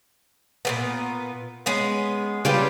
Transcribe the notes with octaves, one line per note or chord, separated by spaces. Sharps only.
A#2 C#3 B3
G#3 B3 C#4
C#3 G3 F4 G4 B4 A5